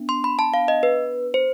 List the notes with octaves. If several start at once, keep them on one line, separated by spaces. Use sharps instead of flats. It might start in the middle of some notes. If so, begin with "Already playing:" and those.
Already playing: B3 D4
C6
B5
A5
F5
D#5
B4
C5